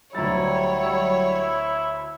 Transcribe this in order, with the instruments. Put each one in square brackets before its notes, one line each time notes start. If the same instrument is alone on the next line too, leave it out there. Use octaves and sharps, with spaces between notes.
[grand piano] D2 A#5 A6 [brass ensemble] F#3 G3 [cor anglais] E4 [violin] C#5